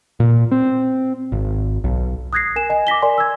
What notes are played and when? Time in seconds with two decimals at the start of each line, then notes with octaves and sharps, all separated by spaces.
0.20 A#2
0.51 C4
1.32 G#1
1.84 B1
2.33 D#6 F#6 G#6 A#6 C7
2.56 A#4 G#5 E7
2.70 D#5 G#5
2.87 D6 A#6 B6 G7
3.02 A#4 D5 G#5 C6
3.18 E6 G#6